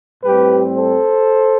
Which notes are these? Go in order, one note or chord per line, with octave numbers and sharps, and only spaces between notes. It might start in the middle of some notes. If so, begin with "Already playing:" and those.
A2 G3 C4 G4 B4
A4 C5